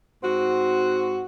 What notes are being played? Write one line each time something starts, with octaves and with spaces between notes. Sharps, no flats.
G#2 C4 F#4